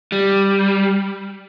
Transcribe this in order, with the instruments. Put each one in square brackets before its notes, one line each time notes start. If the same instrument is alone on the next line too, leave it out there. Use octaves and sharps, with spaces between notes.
[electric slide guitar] G3